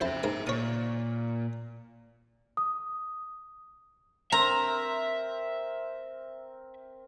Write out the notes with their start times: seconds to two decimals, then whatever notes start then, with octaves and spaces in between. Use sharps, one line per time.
0.01 F2 E4 C5 E5 A5
0.23 G#2 A#4 G#5
0.47 A#2 C#5 D#6
2.57 D#6
4.32 C4 A#4 E5 A#5